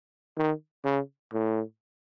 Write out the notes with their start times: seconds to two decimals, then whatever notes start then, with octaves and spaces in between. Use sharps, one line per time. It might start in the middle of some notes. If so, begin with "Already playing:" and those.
0.37 D#3
0.85 C#3
1.33 A2